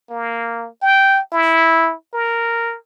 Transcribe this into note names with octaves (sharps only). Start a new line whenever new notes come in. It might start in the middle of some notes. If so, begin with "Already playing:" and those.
A#3
G5
E4
A#4